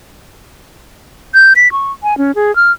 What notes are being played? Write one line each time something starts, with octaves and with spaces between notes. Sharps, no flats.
G6
B6
C#6
G#5
C#4
G#4
F6